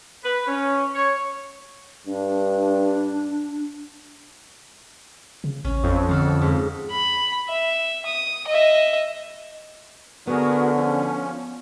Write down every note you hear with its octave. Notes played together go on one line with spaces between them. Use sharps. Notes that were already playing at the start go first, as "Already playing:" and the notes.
B4
C#4
C#5
G2 D4
C#3
A1 C#4
F2
D3 A4 F5 F#5
G#2
B5
E5
D#6
D#5 E5
D3 B3 F#4 G#4 A#4
F3 C#4